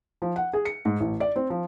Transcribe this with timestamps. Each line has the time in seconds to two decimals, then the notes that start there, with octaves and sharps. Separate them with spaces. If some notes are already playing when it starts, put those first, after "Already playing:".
0.22 F3
0.36 F#5
0.53 G#4
0.65 C#7
0.85 G#2
1.00 A1
1.20 D5
1.36 C4
1.50 F3